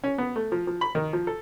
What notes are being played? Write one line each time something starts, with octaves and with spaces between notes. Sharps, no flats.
C#4
B3
A3
F3
F3
B5
D#3
F3
A4